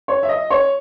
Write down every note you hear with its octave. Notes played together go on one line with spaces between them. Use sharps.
C#5
E5
D#5
C#5